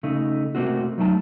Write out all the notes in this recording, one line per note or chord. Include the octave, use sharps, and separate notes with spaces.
C#3 A3 D#4
C3 A3 A#3 C4 F#4
F#3 A3 D#4 G5 A5